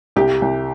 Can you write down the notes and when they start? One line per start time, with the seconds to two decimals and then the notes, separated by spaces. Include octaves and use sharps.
0.16 C2 G4
0.42 C2